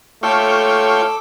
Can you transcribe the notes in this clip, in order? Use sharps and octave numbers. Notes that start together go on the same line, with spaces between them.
A3 F4 A4 C#5 G5 D6 E6